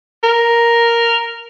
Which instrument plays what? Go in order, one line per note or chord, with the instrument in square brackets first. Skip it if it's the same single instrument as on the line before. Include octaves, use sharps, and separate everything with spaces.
[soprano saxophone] A#4